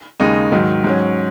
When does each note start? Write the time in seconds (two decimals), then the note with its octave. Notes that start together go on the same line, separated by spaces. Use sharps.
0.20 D#2 C#3 G#3 D#4
0.52 G#2 D#3 F#3
0.84 G#2 F#3 C#4